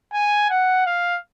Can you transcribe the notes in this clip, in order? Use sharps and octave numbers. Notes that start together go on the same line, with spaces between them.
G#5
F#5
F5